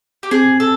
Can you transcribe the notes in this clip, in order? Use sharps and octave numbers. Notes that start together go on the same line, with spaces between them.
G4
C4 G#4
A4